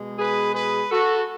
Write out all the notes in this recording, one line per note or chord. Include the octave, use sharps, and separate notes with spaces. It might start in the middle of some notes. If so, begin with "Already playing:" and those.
Already playing: B2 G#3
G#4 B4
G#4 B4
F#4 A4